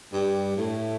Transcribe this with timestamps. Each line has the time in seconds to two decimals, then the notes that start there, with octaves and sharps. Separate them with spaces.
0.13 G2 G3
0.57 A2 A3